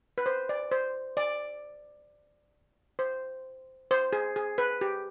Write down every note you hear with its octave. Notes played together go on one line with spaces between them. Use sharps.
B4
C5
D5
C5
D5
C5
C5
G#4
G#4
B4
G4